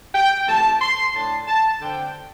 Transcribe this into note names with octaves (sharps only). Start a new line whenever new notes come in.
G5
C3 E3 A3 A5
C6
A2 A3 D4 A5
A5
D3 C4 G5